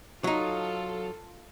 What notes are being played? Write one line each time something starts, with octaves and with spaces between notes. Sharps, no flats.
F#3 D#4 F4 A4